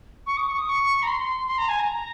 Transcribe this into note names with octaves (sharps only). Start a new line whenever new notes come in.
C#6
D#6
C#6
D#6
C#6
A#5
C6
C6
A#5
G#5
A#5